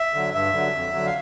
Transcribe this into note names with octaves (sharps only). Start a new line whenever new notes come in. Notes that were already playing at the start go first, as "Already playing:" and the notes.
Already playing: E5
D3 F#3
G2 E5
D3 F#3
F2
D3 F#3
F5